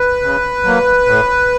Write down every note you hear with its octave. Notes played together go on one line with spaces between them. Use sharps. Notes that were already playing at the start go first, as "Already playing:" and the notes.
Already playing: B4
C#3
F#3 A#3
A2